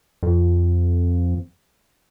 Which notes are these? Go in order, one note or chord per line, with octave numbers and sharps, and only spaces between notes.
F2